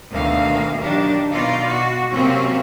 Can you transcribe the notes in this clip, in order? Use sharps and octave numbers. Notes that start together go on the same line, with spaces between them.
D2 B2 D#3 A#3 F5
D#3 F#3 D4 G4
B2 D#4 F4 D5 F5
F#4
C3 F3 F#3 A#3 C4 C#4